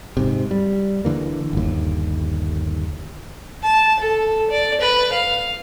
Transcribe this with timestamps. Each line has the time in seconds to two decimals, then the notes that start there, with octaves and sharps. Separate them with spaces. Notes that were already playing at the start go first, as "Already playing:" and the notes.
0.17 G#2 C3
0.51 G3
1.05 D3 E3 A#3
1.53 G1 D#2
3.63 A5
4.00 A4
4.50 D5
4.81 B4
5.12 F5